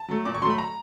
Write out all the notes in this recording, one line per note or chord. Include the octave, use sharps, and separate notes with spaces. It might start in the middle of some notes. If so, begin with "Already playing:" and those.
Already playing: A5
F#3 A3
A#2 D6
C#6
F#3 A3 C6
B5
A#5